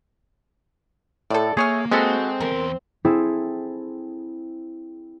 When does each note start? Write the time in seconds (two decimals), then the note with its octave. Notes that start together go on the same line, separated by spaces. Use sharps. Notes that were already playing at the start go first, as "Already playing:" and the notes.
1.30 A2 A4 D5
1.57 A3 A#3 G#4 C#5 D#5 G#5 F6
1.92 G#3 C4 F#4 A4 B4 D#5
2.41 E2 A#4 C6
3.05 C4 E4 G#4 A4